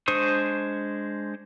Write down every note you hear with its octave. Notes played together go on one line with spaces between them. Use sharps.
G#3 D4 C5 C#6 D#6